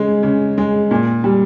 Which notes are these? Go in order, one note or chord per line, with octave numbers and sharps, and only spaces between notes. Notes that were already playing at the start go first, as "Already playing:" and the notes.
Already playing: C#3 G#3
C#3
G#3
A#2
G3